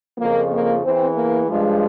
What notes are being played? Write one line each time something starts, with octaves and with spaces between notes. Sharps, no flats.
F2 C#3 F3 A#3
A#3
E2 E3 C4
A#3
G2 F3 G#3